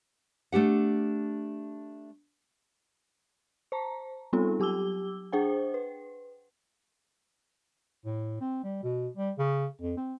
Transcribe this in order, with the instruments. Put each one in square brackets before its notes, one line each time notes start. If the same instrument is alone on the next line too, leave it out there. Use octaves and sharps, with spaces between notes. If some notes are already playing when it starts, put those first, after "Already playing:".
[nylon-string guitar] A3 D4 G4 F#5
[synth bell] C5 A5 A#5
G3 B3 C4 D#4 F4 A4
F#3 G4 D6 E6 G7
D4 G#4 C5 F#5 G5
B4
[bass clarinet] A2
C4
G3
B2
G3
C#3
F2
C4